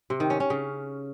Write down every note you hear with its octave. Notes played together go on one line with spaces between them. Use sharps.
C3
D#3
C#4
C#4
C#3